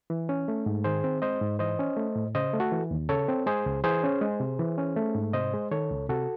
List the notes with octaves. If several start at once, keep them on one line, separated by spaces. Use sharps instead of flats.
E3
C#4
A3
G#2
D#3 G#4 C5
C4
G#3 C5 D#5
G#2
E3 C5 D#5
C#4
A3
A2
C#3 C5 D#5
A3
F#4 A4
E3
D#2
C#3 A4 C#5
C4
G#3 G#4 C5
C#2
E3 G#4 C5
C#4
G#3
C3
E3
C#4
A3
G#2
C3 C5 D#5
G#3
D#3 A4 C#5
C#2
C3 F#4 A4